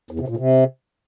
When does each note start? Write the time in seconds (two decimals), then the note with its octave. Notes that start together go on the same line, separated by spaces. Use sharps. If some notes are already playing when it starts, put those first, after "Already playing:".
0.11 E2
0.19 C3
0.28 A#2
0.37 C3